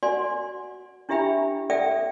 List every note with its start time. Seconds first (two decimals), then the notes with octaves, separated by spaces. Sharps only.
0.03 F#4 D5 F#5 G#5 C6
1.09 D4 E4 G4 E5 G5 B5
1.70 A4 D5 E5 F#5 G5